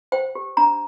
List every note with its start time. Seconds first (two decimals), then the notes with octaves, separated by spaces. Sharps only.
0.12 C5 G5
0.35 G4
0.57 D4 A#5